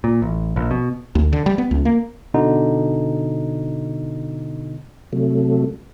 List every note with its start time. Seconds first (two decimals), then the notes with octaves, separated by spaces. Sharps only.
0.04 A#2
0.22 A1
0.56 A#1
0.71 B2
1.15 D2
1.33 D3
1.46 G3
1.58 B3
1.71 C#2
1.85 A#3
2.34 B2 D3 D#4
5.13 C3 F#3 A3